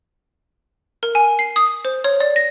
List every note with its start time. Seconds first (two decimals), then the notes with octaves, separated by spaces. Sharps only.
1.03 A#4
1.15 G#5
1.39 C7
1.56 D#6
1.85 C5
2.04 C#5
2.20 D5
2.36 A#6